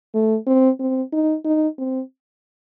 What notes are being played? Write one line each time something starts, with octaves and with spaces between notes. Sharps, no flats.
A3
C4
C4
D#4
D#4
C4